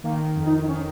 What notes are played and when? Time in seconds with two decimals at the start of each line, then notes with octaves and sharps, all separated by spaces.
0.04 D#3 A#3
0.36 F2
0.46 D#4
0.63 D#4
0.68 D#3 C#4